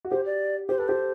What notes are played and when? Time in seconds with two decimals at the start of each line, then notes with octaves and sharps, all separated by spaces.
0.05 F#4
0.11 G4 C5
0.26 D5
0.69 G4 C5
0.78 A4 B4
0.88 G4 C5